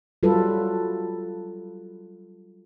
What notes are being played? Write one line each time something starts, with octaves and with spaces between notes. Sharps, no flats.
F#3 G3 F4 A4 B4